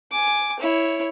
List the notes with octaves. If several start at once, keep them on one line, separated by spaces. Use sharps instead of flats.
G#5 D6
E4 C#5